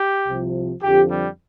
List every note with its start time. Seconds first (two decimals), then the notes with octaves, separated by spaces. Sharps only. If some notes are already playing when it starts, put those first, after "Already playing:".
Already playing: G4
0.27 C2 C3 F3
0.82 F2 D3 F3 G4
1.10 G3